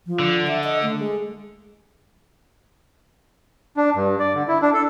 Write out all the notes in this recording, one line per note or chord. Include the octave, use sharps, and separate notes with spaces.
F3
D3
E5
D#5
A3
G#3
D4
G2
D5
D3
E4
D4
A4